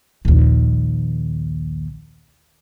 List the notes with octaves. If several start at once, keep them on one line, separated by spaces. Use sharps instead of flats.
A#1 D#2